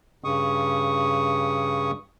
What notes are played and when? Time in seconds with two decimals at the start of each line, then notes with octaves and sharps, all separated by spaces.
0.24 G2 C#3 C#6 D#6